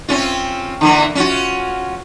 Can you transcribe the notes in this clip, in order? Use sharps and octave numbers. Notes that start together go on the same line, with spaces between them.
C4 C#4 F4
D3 E3 A#3
C#4 F4 F#4